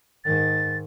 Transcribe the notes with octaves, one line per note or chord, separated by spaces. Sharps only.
G#2 D#3 A6